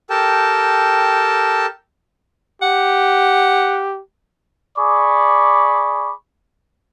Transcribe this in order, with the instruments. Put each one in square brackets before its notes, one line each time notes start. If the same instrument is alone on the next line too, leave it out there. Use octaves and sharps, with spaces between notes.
[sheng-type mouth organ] G4 A4 A#4 G5 A5
[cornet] G4 [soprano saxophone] F#5
[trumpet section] G#4 D5 B5 C#6 D6